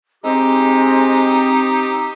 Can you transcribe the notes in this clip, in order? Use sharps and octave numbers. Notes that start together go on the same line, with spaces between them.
G#3 C4 D#4 G4 E6